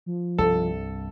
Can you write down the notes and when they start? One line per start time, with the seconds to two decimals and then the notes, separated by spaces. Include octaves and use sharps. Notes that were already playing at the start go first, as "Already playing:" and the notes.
0.06 F3
0.38 C2 G2 A4